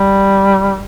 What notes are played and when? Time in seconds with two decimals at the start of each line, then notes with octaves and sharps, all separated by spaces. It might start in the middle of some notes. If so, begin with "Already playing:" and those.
Already playing: G3